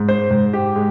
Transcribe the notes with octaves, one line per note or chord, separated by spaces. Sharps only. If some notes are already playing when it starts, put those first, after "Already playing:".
Already playing: G#2
C5
G#2
G4
G#3